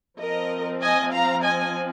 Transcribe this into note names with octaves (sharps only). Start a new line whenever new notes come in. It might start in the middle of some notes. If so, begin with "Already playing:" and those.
F3 C4 A#4 D#5
D#5 G#5
F5 A#5
D#5 G#5